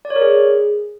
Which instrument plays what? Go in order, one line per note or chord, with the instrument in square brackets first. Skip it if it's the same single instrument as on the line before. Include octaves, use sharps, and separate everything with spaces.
[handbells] D5
C#5
A#4
G#4